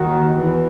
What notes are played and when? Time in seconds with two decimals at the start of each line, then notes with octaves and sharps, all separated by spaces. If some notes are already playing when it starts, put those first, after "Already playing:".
Already playing: D#2 D#3 F#4
0.37 E2 E3